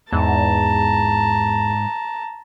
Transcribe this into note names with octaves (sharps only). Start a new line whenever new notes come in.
E2 G#2 A5 A#5